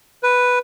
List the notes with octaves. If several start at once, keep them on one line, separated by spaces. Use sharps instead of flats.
B4